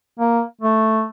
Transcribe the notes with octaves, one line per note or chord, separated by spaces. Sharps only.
A#3
A3